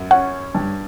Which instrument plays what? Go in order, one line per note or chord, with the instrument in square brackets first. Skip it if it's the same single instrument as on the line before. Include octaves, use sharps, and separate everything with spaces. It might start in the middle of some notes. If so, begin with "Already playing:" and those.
Already playing: [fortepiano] F#2
[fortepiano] C#4 [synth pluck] F#5
[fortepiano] G2